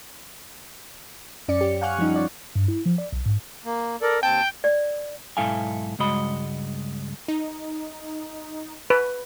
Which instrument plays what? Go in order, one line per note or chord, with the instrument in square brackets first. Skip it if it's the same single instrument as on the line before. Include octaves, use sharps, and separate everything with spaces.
[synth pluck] F#2 C#4 D5 C#7
G4
F5 F#5 G#5 C#6 F6 F#6
F3 G3 C#4 D#4
F3 D5
[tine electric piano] G2
E4
F3
D5
B1
G#2
[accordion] A#3
[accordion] A4 D5 [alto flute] A#4
[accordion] D#2 C4 [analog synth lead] G5 [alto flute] A5
[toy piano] D5
[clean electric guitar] B1 G#2 E4 A4 F5 G#5
C#2 G2 G#3 F#4 D#5 B5
[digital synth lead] D#4
[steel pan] B4